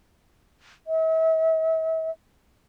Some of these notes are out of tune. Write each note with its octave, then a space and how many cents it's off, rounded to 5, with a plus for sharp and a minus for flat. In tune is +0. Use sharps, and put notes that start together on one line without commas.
E5 -40